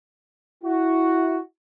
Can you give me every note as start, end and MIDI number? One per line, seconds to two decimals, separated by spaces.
0.64 1.39 64
0.64 1.39 66